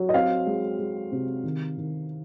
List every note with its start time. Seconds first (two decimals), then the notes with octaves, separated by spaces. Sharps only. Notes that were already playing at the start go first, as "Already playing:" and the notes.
Already playing: F#3
0.09 D#5
0.14 C4 F5
0.46 G#3
0.79 G#3
1.12 C3
1.44 D#3
1.77 D#3